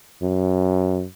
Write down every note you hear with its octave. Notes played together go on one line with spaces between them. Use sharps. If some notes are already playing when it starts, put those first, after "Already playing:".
F#2